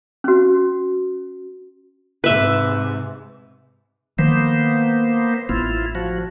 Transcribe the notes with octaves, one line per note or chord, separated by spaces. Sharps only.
C#4 F#4
G#2 C3 B4 E5
D#3 F3 A#3 B3 C5
A1 B3 E4 F4
F3 F#4